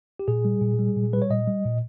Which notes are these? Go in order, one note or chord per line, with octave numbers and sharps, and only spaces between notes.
G4
A#2 G#4
G3
A#2
G3
A#2
G3 B4
C#5
A#2 D#5
G3
A#2